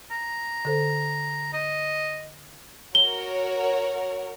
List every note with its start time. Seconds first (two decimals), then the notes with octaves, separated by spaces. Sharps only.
0.11 A#5
0.65 D3 A4 C5
1.53 D#5
2.95 F#4 A#4 C#5 G7